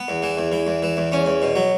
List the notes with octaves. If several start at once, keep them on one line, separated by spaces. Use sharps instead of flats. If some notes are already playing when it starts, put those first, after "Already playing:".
Already playing: B3
E2
E3
E2
E3
E2
E3
E2
E2 C#4
E2
B2
F#3